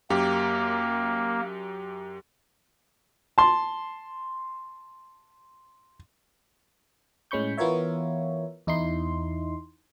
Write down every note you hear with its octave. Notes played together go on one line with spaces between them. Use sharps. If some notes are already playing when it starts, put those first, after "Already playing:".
F#2 A#3 G4
A5 C6
A2 G#3 C#4 B5 C#6 G6
E3 B3 F4 A#4 C#5 E5
E2 D#4 E4 C6